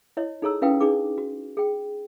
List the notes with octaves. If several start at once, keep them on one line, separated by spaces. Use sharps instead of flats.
E4 C#5 D#5
D#4 G#4 A4 C#5 A#5 E6
C#4 E4 B4 F5 G5 D#6
D4 D#4 G#4 D6
F#4
G#4 G5